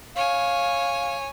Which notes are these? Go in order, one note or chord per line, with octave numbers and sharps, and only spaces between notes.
C#5 F5 G#5